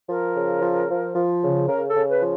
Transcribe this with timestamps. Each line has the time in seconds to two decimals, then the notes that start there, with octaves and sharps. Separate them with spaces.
0.09 F3 A#4
0.36 C#3
0.62 F3
0.89 F3
1.15 F3
1.42 C#3
1.68 C#3 A#4
1.88 A4
1.95 C#3
2.08 B4
2.21 F3